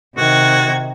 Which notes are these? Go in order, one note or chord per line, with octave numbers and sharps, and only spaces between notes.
C3 D#3 F#4 G#6